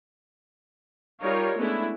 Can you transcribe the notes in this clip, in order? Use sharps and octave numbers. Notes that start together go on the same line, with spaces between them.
G3 D#4 F4 A#4 C#5
G#3 A3 B3 C#4 D4 E4